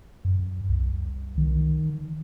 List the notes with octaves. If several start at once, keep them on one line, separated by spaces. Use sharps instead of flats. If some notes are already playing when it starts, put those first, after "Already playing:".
F#2
C2
D#3